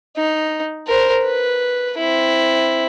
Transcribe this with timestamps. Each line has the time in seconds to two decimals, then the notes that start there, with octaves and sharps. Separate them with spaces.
0.16 D#4
0.87 A#4 C5
1.24 B4
1.98 C4 E4